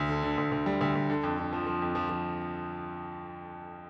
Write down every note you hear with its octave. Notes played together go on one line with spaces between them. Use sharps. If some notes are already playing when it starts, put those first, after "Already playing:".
Already playing: D2
D3
D3
D2
D2
G3
D2
D2
D3
F2
D3
F3
F3
F2
F3
F3